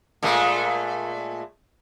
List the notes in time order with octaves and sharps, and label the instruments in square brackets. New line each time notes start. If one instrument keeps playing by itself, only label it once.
[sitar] A#2 G#3 A3